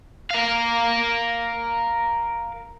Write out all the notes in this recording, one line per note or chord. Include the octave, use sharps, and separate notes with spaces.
A#4 F5